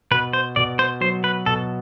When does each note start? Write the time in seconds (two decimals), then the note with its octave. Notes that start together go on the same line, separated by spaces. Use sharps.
0.11 B2 B4
0.33 C5
0.56 B2 D5
0.79 C5
1.01 F#3 C5
1.24 B4
1.46 B2 A4